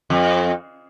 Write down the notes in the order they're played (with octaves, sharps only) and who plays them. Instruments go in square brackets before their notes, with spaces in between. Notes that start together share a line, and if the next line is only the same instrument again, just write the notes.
[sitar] F2